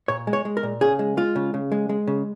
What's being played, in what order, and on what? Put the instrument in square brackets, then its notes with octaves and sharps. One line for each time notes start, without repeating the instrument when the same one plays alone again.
[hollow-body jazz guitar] A#2 C#5
G#3
C#5
G#3
A#4
A#2
C#3 G#4
G#3
G#3 F4
C#3
C#3
G#3
G#3
C#3